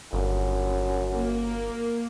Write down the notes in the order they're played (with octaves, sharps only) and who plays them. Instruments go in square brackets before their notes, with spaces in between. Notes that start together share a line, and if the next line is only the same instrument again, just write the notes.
[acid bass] G1 [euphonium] F#2
[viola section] A#3